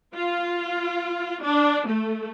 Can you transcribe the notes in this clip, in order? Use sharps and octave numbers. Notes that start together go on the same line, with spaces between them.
F4
D4
A3